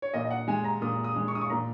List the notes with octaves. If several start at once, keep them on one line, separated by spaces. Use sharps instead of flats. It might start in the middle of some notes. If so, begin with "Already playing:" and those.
C#5
A#2 D#5
D#5
F#5
G#3 G#5
A#5
A#2 D#6
D#6
G#3
C#6
D#6
C#6
A#2 A#5